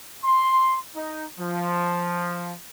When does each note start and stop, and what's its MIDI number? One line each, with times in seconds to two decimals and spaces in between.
0.23 0.77 84
0.96 1.25 63
1.39 2.54 53